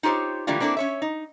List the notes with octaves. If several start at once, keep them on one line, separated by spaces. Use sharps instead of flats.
D#4 F4 G4 C5 C#5
D3 E3 G3 A3 A#3 F4
A#3 C4 D4 E4 A4
C#4 C#5 E5
D#4